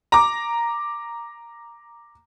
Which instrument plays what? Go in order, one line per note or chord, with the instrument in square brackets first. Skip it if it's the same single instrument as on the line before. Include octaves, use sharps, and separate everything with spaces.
[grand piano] A#5 D6